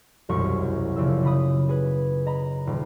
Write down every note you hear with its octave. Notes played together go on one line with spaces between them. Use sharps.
E1 C2 F#2 C#6
A#1 C#3 E5 E6
C#3 B5 D#6
G#4 B4
D#5 A#5 B5
D#1